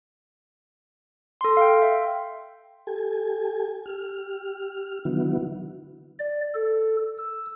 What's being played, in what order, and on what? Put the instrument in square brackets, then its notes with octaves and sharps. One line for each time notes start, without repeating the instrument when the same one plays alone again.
[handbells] A4 C6
F5 G5
E5 G5 C6
[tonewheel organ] G4 A4 G#5
G4 F6
D3 D#3 F#3 B3 E4 F#4
[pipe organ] D5
A4
E6